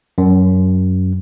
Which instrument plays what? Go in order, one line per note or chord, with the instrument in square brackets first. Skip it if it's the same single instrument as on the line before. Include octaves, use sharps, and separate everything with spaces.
[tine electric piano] F#2